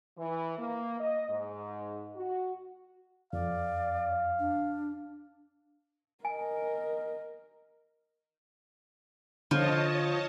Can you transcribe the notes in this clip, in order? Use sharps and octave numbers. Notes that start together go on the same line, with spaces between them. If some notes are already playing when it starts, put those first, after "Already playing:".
E3
A#3
D#5
G#2
F#4
F2 D5 F5
D4
A#4 D#5 G#5
D3 F3 C#5 D#5 A5